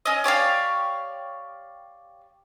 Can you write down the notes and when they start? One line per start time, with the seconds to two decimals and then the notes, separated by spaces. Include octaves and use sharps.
0.05 C#4 D#5
0.24 G4 C#5 D5 F5